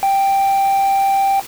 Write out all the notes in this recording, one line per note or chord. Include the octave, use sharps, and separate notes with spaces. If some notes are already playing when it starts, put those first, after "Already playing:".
G5